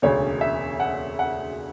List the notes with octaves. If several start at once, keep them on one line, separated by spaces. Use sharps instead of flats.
E1 D2 C#3 C#5
E5
F#5
F#5